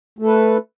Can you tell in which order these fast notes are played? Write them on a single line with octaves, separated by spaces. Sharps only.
A3 A4 B4